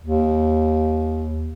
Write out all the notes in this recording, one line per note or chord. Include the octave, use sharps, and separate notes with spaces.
D#2